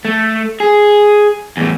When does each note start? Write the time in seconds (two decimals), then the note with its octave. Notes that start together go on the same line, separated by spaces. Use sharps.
0.05 A3
0.60 G#4
1.57 E2 A2